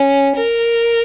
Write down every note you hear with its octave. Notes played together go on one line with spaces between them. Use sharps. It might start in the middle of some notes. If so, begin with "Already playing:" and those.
Already playing: C#4
A#4